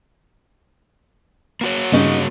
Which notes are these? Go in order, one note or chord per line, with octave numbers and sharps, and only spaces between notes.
A#3 F#4 C#5
G2 C#3 C#4 D#4